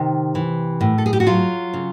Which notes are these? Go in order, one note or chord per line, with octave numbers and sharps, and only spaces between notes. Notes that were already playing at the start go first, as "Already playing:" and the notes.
Already playing: C3 D#3
E3
A2
A4
G#4
G4
F#4
F#3 F4
C#3